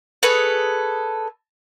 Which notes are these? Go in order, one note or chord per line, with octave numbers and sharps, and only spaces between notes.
G#4 A4 B4 C#5